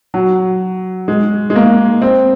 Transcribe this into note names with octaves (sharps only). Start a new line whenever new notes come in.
F#3
G#3
G#3
A#3
C4